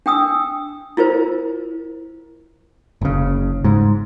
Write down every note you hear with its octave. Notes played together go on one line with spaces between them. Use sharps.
D4 G5 D#6 E6
E4 F4 A#4 C5
F#1 C#3
G#2